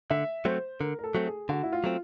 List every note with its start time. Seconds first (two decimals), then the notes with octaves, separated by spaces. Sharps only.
0.10 D3 E5
0.45 F#3 A3 C4 C5
0.80 D3 A#4
0.99 A#4
1.04 A4
1.15 F#3 A3 C4
1.27 G#4
1.49 D3 F#4
1.63 E4
1.72 F4
1.84 F#3 A3 C4